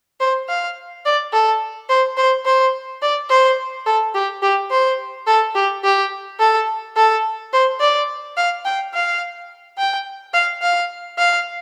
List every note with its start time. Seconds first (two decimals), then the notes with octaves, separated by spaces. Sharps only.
0.20 C5
0.49 F5
1.05 D5
1.33 A4
1.89 C5
2.17 C5
2.45 C5
3.02 D5
3.30 C5
3.86 A4
4.14 G4
4.42 G4
4.71 C5
5.27 A4
5.55 G4
5.84 G4
6.39 A4
6.96 A4
7.53 C5
7.81 D5
8.37 F5
8.65 G5
8.94 F5
9.78 G5
10.34 F5
10.62 F5
11.18 F5